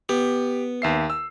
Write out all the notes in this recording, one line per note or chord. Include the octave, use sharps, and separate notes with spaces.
B3 G4
D#2 E5 C7
E6